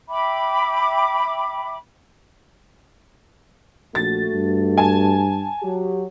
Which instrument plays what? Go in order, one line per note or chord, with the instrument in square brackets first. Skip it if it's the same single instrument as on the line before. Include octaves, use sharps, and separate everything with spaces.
[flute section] E5 G5 B5 D6
[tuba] A#1 [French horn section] A3 F#4 [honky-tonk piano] A6
[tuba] G2
[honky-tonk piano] G#5 A5
[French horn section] F#3 G4